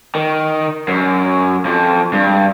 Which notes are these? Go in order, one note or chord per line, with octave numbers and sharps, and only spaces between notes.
D#3
F#2
F2
G2